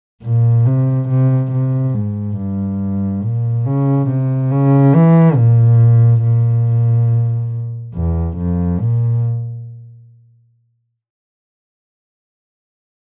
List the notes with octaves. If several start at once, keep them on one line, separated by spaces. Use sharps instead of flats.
A#2
C3
C3
C3
G#2
G2
A#2
C#3
C3
C#3
E3
A#2
A#2
E2
F2
A#2